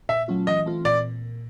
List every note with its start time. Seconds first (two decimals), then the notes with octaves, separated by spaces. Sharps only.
0.09 A#2 E5
0.28 F#3 A3 C#4 F4
0.47 E3 D#5
0.66 A3 C4 F4
0.85 A#2 D5